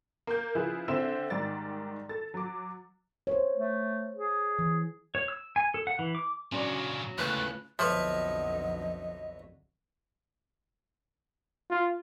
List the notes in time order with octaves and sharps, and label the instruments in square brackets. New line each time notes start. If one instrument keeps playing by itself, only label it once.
[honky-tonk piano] A#3 G6
C#3 F3 E4 F4 G#4 B4
D3 C4 C5 E5 E6 E7
G#2 D#3 G3 D5 A6
A4 A6
F#3 D6
[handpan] C5 C#5
[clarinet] A3
G#4
[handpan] E3
[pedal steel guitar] C#5
E6
G#5
A4
F#5
E3
D6
[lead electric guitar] A#2 C#3 [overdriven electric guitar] F#3 [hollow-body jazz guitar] C#4 D4 D5
[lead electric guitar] D2 A3 [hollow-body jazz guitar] A2 C#3 [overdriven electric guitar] F4 B4 [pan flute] F#6
[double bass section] B1 F2 D3 [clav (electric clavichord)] F3 [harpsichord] B4 C#5 E5 [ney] D#5
[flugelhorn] F4